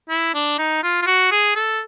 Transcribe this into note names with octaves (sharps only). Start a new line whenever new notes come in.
E4
D4
D#4
F4
F4
F#4
G#4
A4